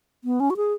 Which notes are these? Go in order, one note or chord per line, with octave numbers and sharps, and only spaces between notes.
B3
C#4
F#4
G#4